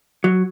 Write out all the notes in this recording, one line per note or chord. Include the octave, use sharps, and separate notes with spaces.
F#3